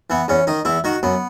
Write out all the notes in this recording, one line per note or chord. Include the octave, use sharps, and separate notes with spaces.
E3 B3
E2 C#4
D#3 D#4
E2 E4
D#3 F#4
F#2 B3